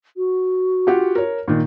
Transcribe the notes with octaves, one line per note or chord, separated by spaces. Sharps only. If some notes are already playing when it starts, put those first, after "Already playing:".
F#4
F4 G4 F#5
A#4 C#5
A#2 D#3